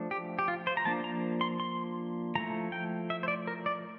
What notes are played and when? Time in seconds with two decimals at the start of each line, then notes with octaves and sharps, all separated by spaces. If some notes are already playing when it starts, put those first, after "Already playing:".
Already playing: F3 A3 D4
0.11 G4
0.39 G4
0.48 F4
0.67 C5
0.77 A#5
0.85 F3 A#3 D4 A5
1.04 A#5
1.41 C6
1.60 C6
2.35 F3 A3 E4 A#5
2.72 G5
3.10 E5
3.23 C5
3.28 D5
3.47 A#4
3.66 D5